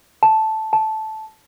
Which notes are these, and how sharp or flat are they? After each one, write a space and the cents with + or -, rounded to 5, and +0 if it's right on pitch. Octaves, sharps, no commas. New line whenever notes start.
A5 -5
A5 -10